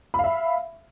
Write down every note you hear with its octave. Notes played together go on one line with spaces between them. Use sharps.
E5 F5 B5